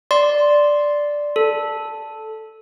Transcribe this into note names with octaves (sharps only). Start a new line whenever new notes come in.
D5 C6
A4